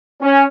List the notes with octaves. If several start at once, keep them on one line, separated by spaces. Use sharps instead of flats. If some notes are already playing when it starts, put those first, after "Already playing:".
C#4